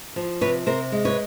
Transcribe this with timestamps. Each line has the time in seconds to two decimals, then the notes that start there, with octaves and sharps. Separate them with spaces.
0.16 F3
0.41 C3 B4 C#5
0.66 C3 A#4 C5
0.92 G#3
1.05 B4 C#5